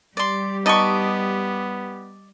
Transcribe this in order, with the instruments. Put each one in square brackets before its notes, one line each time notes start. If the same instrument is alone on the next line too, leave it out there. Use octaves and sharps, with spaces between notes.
[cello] G3 G4 [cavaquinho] D5 C6
[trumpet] B3 [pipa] D#4 C#6 [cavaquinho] D5 D#5 A5